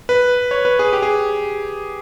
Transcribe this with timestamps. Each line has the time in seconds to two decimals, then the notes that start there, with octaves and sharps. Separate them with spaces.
0.09 B4
0.51 C#5
0.65 B4
0.79 G#4
0.93 G4
1.02 G#4